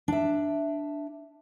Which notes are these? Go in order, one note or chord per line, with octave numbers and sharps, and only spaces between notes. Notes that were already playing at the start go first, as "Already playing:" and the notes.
D4 E5